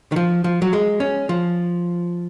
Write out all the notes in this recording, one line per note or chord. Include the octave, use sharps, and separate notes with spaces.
D#3
F3
F3
F#3
G#3
C#4
F3